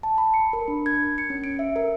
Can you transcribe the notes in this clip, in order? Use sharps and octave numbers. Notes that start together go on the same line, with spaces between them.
A5
B5
C#7
A#4
D4
G#6
C#7
C#4
D7
E5
A#4